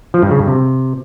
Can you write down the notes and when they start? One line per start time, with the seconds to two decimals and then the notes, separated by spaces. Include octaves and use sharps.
0.14 F3
0.22 G2
0.31 C#3
0.39 G2
0.48 C3